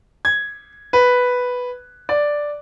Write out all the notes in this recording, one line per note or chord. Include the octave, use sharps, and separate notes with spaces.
G#6
B4
D5